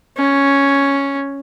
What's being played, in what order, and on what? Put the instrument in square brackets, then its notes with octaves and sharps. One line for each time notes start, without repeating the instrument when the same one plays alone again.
[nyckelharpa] C#4